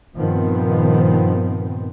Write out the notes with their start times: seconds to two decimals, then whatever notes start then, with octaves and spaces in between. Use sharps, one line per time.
0.15 G2 A#2 D#3 F3 B3 C4